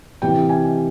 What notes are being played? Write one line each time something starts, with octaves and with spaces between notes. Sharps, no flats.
C3 E3 G3 G5
G#5